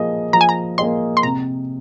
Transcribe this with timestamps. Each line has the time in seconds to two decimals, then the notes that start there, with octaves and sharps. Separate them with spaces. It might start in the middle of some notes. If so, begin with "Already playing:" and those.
Already playing: F3 A#3 G#4 D#5
0.33 F3 A#5
0.41 G#5
0.49 A#5
0.78 A#3 G#4 D#5 C6
1.17 C6
1.23 C3 A#5